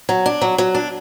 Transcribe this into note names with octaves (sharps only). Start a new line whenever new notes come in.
F#3
D4
F#3
F#3
D4